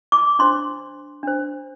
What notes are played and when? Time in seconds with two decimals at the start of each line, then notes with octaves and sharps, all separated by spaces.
0.12 D6
0.39 D4 C5 C6
1.23 D4 C5